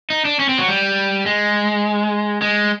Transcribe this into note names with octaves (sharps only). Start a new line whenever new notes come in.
D#4
D4
C#4
C4
F#3
G3
G#3
G#3